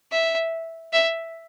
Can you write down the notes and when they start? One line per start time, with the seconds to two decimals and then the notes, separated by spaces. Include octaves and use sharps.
0.12 E5
0.93 E5